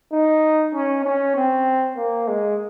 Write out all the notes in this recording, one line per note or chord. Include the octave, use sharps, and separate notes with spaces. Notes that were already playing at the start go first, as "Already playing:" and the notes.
D#4
C#4
C#4
C4
A#3
G#3